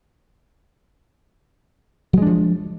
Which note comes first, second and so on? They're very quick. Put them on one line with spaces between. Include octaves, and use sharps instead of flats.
F#3 G#3 D4 F3